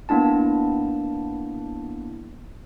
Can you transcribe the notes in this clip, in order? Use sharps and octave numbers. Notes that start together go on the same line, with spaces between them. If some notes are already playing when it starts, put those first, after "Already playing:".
A#3 B3 D4 E4 A5